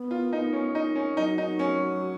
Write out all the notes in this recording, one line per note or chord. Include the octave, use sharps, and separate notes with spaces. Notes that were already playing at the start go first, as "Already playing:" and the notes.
Already playing: B3
F4
D#4
C#4
D#4
C#4
F#3 D#4
D#4
C#4